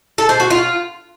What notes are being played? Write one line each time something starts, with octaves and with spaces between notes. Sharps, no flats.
A4
C5
F#4
F4